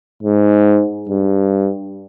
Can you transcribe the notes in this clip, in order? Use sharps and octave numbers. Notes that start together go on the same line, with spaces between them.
G#2
G2